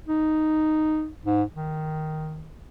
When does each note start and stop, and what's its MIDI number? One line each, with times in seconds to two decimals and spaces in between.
0.07 1.08 63
1.25 1.43 44
1.54 2.51 51